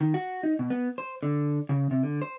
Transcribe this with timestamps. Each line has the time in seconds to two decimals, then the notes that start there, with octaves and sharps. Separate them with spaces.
0.01 D#3
0.14 F#4
0.43 D#4
0.59 B2
0.70 B3
0.98 C5
1.23 D3
1.69 C#3
1.91 C3
2.03 D3
2.22 C5